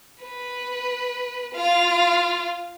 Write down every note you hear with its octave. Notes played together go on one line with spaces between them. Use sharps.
B4
F4 F5